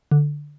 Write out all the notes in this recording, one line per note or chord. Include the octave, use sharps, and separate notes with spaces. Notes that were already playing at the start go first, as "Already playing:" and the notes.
D3